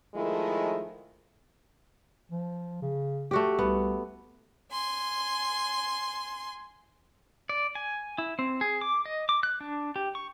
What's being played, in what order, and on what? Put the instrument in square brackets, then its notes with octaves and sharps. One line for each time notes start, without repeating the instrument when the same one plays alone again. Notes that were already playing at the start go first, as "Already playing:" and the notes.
[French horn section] D#3 F3 G#3 A3 E4
[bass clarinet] F3
C#3
[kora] A3 F#4 G4
[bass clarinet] C2 [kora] B3
[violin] G#5 C6
[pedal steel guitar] D5
G#5
E4
C4
G#4
D6
D#5
D6
F#6
D4
G4
C#6